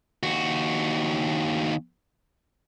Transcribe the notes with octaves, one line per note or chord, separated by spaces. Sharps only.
D#2 F#4